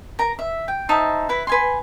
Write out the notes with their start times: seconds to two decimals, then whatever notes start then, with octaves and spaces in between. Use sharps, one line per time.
0.19 A#4 A#5
0.39 E5
0.68 G5
0.89 D#4 C5 E5 A5
1.29 E4 B4
1.47 B4 G#5 C6